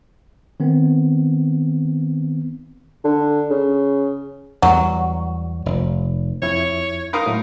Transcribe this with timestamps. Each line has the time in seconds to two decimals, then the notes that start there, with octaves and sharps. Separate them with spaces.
0.60 D#3 B3 C4
3.04 D3
3.50 C#3
4.62 E2 F#3 G3
5.66 F1
6.42 F2 E4 C#5
7.13 D#4 A#4 F5 B5 C6 D#6
7.26 A2 F#3 A3